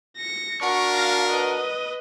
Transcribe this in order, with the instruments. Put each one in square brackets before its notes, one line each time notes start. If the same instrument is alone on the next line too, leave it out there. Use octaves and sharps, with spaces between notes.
[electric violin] A#6 C#7
[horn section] D4 F#4 A#4 [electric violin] C#6
[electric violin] F5 A#6
B4 D#5